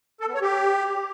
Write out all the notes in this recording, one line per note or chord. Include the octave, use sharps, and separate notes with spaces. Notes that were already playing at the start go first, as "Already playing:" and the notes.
A4
B3
C#5
G4